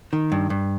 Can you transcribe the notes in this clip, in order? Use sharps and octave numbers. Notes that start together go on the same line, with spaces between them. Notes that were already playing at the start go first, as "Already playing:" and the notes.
D#3
G2
G2